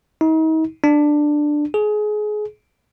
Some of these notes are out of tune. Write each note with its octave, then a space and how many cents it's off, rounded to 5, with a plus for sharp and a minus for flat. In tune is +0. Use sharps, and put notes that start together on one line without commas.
D#4 +40
D4 +10
G#4 +25